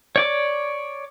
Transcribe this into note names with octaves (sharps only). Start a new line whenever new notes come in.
C#5 D5 D6